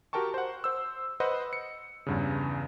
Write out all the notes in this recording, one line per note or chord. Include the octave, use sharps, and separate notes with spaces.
F#4 G4 A#4 G5 A5 C#6
C5 F#5
C5 E6
B4 C5 D#5 F#5
C#7
E2 G2 C#3